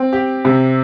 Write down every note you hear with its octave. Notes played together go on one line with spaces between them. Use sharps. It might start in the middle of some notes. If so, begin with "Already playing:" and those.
Already playing: C4
G4
C3